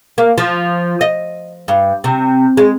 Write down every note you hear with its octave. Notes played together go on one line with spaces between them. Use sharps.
A#3
F3
D#5
G2
C3
G#3